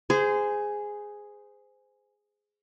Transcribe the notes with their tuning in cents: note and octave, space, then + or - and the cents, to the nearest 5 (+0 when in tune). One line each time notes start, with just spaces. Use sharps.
G#4 +0 C5 -25